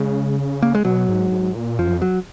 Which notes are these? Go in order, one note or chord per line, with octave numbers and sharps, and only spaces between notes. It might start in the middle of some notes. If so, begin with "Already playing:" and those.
Already playing: C#3 G#3
A#3
G#3
B2 F#3
G#2
G#2
A#2
F2 F3
F#2
F2
F#3